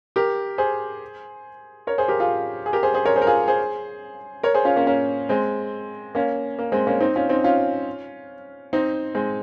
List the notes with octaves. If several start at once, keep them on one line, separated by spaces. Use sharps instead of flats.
G4 A#4
G#4 C5
A#4 C#5
G#4 C5
G4 A#4
F4 G#4
G#4
G4 A#4
G#4 C5
G#4 C5
A#4 C#5
G#4 C5
A#4
F4 G#4
G#4 C5
A#4 C#5
G#4 C5
C#4 F4
A#3 C#4
A#3 C#4
G#3 C4
A#3 C#4
A#3
G#3 C4
A#3 C#4
C4 D#4
C#4 F4
C4 D#4
C#4 F4
C4 D#4
G#3 C4